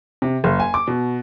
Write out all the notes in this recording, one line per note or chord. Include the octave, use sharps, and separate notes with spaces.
C3
F#1
G#5
D6
B2